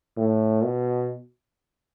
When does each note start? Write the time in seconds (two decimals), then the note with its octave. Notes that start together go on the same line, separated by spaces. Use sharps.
0.17 A2
0.64 B2